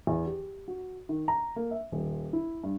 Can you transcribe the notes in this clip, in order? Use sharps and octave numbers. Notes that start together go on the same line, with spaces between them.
E2
G4
F#4
D#3
A#5
A#3
E5
D#1
E4
G2